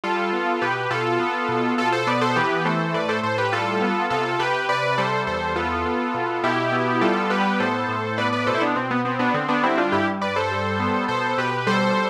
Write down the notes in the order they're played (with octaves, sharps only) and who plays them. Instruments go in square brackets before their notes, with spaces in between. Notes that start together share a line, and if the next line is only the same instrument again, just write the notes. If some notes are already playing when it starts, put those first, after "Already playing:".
[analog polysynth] G3 F4 A4
B3
B2 G4 B4
B2 F4 A4
B3
B2
B2 F4 A4
A4 C5
B3 B4 D5
A4 C5
E3 G4 B4
A3 A4 C5
A2 B4 D5
A4 C5
A2 A4 C5
G4 B4
G3 F4 A4
B3
C3 F4 A4
C3 G4 B4
C3 B4 D5
G3 A4 C5
E2 A4 C5
B3 F4 A4
B3
B2
B2 E4 G4
B3
G3 F4 A4
B3 G4 B4
A2 A4 C5
A2
B3 B4 D5
B4 D5
B2 A4 C5
E4
B3 D4
B2 C4
B3
B3 C4
B3 D4
D3 C4
B3 D4
G3 C4 E4
D4 F4
G2 E4 G4
G2 B4 D5
A4 C5
G3
B3
B2 A4 C5
B2 G4 B4
G3 A4 C5